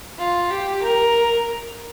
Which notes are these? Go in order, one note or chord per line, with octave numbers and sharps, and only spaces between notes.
F4
G4
A#4